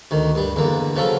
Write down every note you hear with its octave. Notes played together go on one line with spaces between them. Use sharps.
D2 D#3
G2 G3
E2 D3 A#3
C#3 F3 F#3 F4 A4